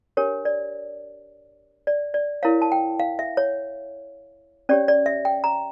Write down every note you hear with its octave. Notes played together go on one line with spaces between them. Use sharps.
D4 G4 A#4 C#5
D5
D5
D5
E4 A#4 C#5 F5
A5
G5
F5
E5
C#5
C#4 G4 C#5 D5
D5
E5
G5
A#5